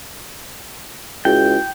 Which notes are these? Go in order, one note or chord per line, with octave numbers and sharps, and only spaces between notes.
C#2 E4 F#4 G#4 G5